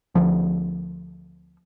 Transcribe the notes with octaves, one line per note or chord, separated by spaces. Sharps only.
D2 F3